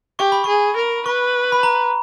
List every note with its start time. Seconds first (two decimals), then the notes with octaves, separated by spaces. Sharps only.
0.19 G4 C#6
0.32 B5
0.44 G#4 C#6
0.77 A#4
1.06 B4 C#6
1.52 B5
1.63 A#5